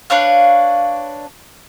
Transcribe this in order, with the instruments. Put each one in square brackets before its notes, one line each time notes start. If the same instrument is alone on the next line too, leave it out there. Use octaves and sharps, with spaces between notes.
[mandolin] D4 B4 C#5 F5